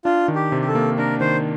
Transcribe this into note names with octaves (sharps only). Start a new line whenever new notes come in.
D4 F4
D#3
G4
C3
G4
A4
A#3
D4 A#4
D#3 C5